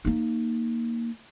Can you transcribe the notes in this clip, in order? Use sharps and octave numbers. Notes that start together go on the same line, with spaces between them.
A#3 D#4